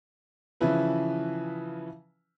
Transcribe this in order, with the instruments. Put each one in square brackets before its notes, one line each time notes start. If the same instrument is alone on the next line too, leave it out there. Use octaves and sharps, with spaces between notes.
[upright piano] C#3 E3 F3 C#4 E4 B4